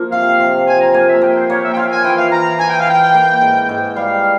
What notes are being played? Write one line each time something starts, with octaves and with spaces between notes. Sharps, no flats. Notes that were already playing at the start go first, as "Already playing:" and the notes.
Already playing: F3 A#3
C3 F5
C3
F3 G#5
A#5
A#3 G#5
E5
A#3 G5
C5
A#3 C#5
E5
G5
F4 F5
G#5
E3 G5
F5
E3 A#5
E3 G#5
G5
F5
E3 G5
A#3
G#2
G#2
G3 F5